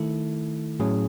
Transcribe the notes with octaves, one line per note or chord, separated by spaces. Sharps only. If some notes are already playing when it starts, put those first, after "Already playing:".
Already playing: D#3 A3 E4 A4
A2 F#3 C#4 G#4